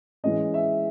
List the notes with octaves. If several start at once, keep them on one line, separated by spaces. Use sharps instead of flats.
E3 G#3 C#4 D#5
E5